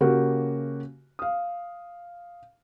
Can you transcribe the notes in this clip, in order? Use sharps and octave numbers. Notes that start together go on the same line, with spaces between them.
C#3 A#3 F#4 G4 A#4
F5 D#6